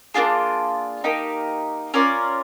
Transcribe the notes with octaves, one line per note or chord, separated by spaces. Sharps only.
A#3 D4 F4 G#4
A#3 D#4 G4
C#4 F4 A#4 D5